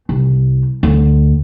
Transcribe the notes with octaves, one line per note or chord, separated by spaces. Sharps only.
C2
D2